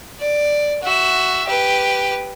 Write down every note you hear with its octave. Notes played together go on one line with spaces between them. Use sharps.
D5
F#4 E5
G4 B4